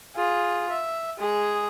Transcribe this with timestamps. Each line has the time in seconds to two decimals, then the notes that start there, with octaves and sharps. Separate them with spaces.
0.16 F4 G#4
0.71 E5
1.19 G#3 G#4